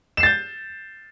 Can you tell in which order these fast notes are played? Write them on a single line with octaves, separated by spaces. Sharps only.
E7 C7 A6 G6